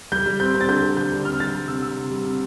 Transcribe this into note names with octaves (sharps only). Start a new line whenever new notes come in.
G3 G6
G3
C4 G6
C4
A6
D3 G6
D3
G3 G6
D3
C4 F6
G3 A6
G3
C3 E6
C3 E6
C3
G3
C3